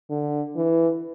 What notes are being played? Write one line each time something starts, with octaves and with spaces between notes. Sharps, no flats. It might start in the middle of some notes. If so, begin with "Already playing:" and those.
D3
E3